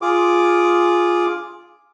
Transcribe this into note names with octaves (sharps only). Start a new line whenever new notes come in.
F4 G#4 D6